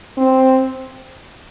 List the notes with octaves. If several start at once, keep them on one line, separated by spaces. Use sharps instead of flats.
C4